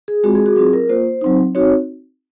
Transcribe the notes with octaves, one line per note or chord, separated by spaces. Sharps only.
G#4
G#3 C4 F4 F#4
G#4
F#4
F#3 C4 F4 G#4
A#4
A#3 F4 C5
F#3 C4 D#4
C4 D#4 F#4 C#5